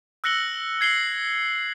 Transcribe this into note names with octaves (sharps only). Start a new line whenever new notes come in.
E6 F#6 A#6 C#7 F#7 G7
G#6 C7 F#7 G7